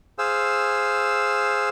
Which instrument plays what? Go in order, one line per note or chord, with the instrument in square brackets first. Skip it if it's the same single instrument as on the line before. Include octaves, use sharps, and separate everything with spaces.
[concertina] G#4 C5 F5 E6